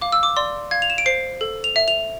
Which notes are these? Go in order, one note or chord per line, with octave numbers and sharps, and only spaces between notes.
F5 D6
E6
D6
D5 C6
F5 G#6
F7
E7
D7
C5 C7
A4
F7
E5
F7